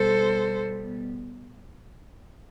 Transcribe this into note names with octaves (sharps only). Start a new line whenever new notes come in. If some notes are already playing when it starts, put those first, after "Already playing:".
Already playing: B2 G3 B3 A4 C5